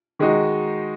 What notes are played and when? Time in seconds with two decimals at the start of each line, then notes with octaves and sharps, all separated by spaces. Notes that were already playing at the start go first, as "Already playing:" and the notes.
0.19 D#3 G#3 D#4 F#4